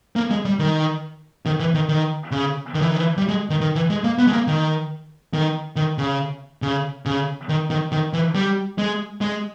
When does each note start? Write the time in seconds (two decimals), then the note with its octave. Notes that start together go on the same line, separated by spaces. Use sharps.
0.16 A#3
0.31 G#3
0.45 G3
0.59 D#3
1.46 D#3
1.60 E3
1.74 D#3
1.89 D#3
2.31 C#3
2.75 D#3
2.82 E3
2.89 D#3
2.96 E3
3.17 G3
3.28 G#3
3.50 D#3
3.61 D#3
3.75 E3
3.90 G#3
4.04 A#3
4.18 B3
4.27 G#3
4.33 A#3
4.47 D#3
5.34 D#3
5.76 D#3
5.98 C#3
6.62 C#3
7.06 C#3
7.49 D#3
7.70 D#3
7.92 D#3
8.13 E3
8.35 G3
8.78 G#3
9.21 G#3